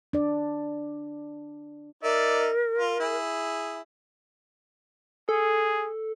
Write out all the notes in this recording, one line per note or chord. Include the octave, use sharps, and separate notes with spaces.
D4 D5
D#4 A#4 D5 E5
F4
E4 G#4
G#4 A4